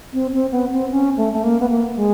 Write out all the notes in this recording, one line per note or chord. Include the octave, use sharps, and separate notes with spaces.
C4
C4
B3
C4
C#4
A3
A3
A#3
B3
A#3
G#3